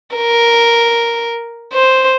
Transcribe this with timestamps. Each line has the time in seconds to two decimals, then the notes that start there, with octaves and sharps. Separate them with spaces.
0.16 A#4
1.73 C5